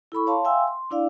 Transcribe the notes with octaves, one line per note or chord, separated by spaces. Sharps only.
E4 A4 B5 C#6
C#5 F5 A5 C6
E5 F5 G5 G#5 C6 E6
C6
D4 E4 D5 F5